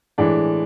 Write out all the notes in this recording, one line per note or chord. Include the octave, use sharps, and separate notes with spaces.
A2 E3 G#3 D4